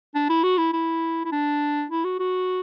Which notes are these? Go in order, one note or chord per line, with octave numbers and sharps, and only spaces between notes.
D4
E4
F#4
E4
E4
E4
D4
E4
F#4
F#4